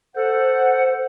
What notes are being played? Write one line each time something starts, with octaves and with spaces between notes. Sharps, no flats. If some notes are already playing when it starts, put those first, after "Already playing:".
A4 C5 F#5